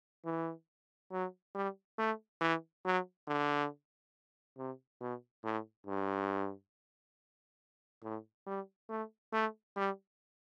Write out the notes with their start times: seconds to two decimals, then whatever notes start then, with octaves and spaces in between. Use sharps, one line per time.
0.25 E3
1.12 F#3
1.55 G3
1.98 A3
2.41 E3
2.85 F#3
3.27 D3
4.57 C3
5.00 B2
5.44 A2
5.86 G2
8.03 A2
8.46 G3
8.89 A3
9.33 A3
9.76 G3